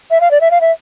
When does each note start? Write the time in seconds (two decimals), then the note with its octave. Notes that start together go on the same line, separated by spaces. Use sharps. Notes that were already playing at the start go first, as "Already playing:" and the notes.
0.11 E5
0.21 F5
0.31 D5
0.41 E5
0.51 F5
0.61 E5